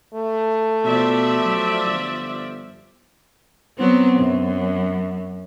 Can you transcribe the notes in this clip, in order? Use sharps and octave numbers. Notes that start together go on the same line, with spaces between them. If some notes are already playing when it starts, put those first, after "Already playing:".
A3
B2 F3 D5 E5
F#3
G1
F#3 B3 C4
F#2